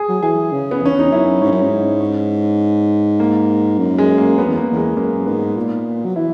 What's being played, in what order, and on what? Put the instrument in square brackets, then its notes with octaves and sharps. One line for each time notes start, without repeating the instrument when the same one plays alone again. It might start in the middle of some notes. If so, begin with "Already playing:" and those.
Already playing: [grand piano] G#4
[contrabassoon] F#3
[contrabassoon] E3 [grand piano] G#4
[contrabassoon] C#3
[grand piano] B3
[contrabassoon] E2
[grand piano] C#4
[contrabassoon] E2 [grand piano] D#4
[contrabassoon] F#2 [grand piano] E4
[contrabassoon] G#2 [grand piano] C#4
[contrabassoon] F#2
G#2
[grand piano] C#4
A#3
[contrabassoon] F#2
[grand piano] G#3
A#3
[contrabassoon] F#2 [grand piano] B3
[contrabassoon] E2
[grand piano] A#3
[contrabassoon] E2 [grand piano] G#3
[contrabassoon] F#2 [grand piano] A#3
[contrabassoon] G#2 [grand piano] B3
[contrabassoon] A#2
F#3
[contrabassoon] E3 [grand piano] E4